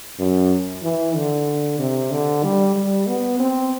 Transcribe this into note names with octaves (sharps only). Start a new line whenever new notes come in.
F#2
E3
D3
C3
D3
G3
G3
B3
C4